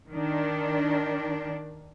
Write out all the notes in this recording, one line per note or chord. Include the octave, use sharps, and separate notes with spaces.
D#3 D4